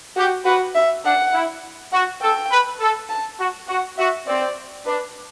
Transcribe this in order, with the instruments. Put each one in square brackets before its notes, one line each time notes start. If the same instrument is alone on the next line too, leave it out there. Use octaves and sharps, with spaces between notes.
[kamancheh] F#4 [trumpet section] G4
[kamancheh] F#4 [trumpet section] B4
[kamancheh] E5
[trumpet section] D4 [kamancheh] F#5
[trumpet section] E4
[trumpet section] F#4 [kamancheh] F#5
[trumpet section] A4 [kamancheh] G5
[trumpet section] B4
A4
[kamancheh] A5
[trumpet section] F#4
[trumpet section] F#4 [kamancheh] F#5
[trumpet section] F#4 [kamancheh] E5
[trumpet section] C4 [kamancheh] D5
[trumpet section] D4 [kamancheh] B4